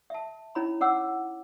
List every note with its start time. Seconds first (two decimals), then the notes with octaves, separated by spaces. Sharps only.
0.10 E5 A5
0.55 C#4 D#4 E4 C#5 A#5 B5
0.81 C#4 C#5 F#5 D6 E6